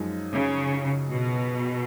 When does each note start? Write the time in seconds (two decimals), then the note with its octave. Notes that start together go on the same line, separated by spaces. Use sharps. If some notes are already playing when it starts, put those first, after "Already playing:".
Already playing: F#2 F3 G#3 D#4
0.32 C#3
1.11 B2